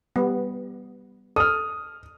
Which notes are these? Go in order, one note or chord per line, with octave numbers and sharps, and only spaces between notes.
G3 B3
A4 D#6 F6